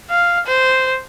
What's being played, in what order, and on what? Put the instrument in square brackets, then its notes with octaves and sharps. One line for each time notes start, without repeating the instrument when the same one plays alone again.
[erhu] F5
C5